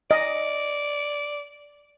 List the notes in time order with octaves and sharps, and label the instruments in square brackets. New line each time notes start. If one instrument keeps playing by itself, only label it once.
[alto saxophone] D5 [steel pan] D#5